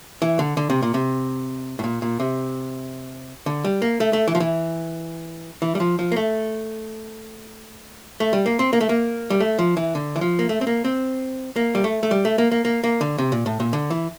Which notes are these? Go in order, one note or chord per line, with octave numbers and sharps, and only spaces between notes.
E3
D3
D3
C3
A#2
C3
A2
A#2
A#2
C3
D3
G3
A#3
A3
A3
E3
F3
E3
E3
G3
F3
F3
A#3
A3
A3
G3
A#3
C4
A#3
A3
A#3
G3
A3
F3
E3
D3
E3
F3
A#3
A3
C4
A#3
C4
A#3
G3
A3
A3
G3
A3
A#3
A#3
A#3
A#3
D3
C3
A#2
A2
A#2
D3
E3